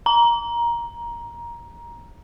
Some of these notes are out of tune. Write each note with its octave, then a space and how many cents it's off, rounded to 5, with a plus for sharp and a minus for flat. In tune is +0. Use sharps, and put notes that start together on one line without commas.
A#5 +15